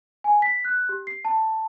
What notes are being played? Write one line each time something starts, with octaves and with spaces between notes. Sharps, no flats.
G#5
B6
F#6
G4
C7
A5